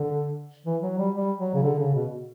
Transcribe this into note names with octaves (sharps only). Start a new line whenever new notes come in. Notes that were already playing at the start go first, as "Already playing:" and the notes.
Already playing: D3
E3
F#3
G3
G3
F#3
C#3
D3
C#3
B2